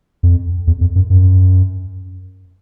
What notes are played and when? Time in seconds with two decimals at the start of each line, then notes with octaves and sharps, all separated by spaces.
0.23 F2
0.67 E2
0.81 F2
0.95 F#2
1.10 F#2